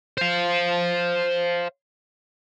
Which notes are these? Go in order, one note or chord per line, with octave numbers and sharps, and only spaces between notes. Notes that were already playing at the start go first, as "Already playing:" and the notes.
C5 F5